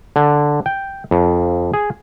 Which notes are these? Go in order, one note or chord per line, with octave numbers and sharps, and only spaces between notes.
D3
G5
F2
G#4